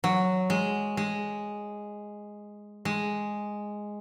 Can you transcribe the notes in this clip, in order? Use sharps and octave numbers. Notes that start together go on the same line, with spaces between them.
F#3
G#3
G#3
G#3